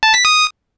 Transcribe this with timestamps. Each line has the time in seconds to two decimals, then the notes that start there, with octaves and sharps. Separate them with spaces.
0.03 A5
0.14 B6
0.25 D#6